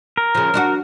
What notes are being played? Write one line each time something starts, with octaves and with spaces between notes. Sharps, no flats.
A#4
C#3 F3
D4 F4 F#4